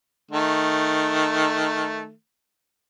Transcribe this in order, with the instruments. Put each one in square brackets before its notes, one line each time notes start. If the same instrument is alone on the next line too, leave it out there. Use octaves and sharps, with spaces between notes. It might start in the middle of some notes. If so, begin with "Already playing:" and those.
[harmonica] D#3 A3